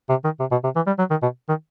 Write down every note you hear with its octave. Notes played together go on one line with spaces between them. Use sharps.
C3
D#3
C3
B2
C3
E3
G3
F#3
D#3
B2
D#3